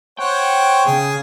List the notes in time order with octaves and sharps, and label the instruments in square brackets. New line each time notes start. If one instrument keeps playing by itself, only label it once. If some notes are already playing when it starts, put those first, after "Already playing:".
[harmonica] C5 C#5 F#5 [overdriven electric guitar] G5
[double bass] C#3 [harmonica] G#4